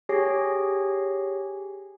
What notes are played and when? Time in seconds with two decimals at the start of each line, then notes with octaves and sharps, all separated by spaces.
0.09 G4 G#4 C#5 G#5 A#6 C7